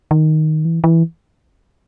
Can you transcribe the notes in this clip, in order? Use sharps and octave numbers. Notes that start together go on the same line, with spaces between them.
D#3
E3
E3